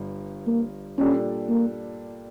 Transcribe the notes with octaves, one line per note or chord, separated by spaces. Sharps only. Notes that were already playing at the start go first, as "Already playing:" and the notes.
Already playing: G1 G2
A#3
A#2 G3 C#4 D4 A4
A#3